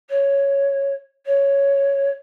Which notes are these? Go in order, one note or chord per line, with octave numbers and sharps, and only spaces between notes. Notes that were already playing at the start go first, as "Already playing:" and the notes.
C#5
C#5